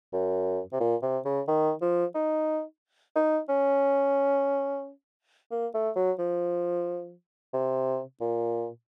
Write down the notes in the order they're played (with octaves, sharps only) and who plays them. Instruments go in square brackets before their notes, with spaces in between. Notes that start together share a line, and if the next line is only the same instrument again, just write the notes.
[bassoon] F#2
C3
A#2
C3
C#3
D#3
F3
D#4
D#4
C#4
A#3
A3
F#3
F3
C3
A#2